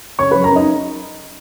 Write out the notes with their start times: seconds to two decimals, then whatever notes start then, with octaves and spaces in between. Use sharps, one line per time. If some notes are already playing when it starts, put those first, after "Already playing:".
0.19 C#3 C#5 C#6
0.31 B4 B5
0.35 F#2
0.44 A#4 A#5
0.52 C#4 D#4 D#5